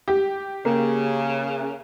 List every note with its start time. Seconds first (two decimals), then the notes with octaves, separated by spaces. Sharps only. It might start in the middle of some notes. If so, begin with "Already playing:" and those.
0.08 G4
0.65 C#3 A#3